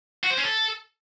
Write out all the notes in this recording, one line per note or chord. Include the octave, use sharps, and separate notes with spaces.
F#4
C5
C#4
A4